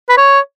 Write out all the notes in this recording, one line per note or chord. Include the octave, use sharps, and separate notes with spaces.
B4
C#5